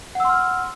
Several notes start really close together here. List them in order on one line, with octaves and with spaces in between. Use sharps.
F#5 E6 C6 F6